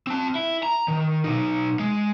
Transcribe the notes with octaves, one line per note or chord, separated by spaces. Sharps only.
C4 A5
E4
A#5
D#3
B1 D#4
G#3